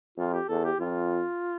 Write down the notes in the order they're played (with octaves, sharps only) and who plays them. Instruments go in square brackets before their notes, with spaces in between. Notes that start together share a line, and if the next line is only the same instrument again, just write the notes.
[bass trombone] F2 [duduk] F4
[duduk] G4
[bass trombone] E2 [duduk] A4
[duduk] G4
[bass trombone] F2 [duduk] F4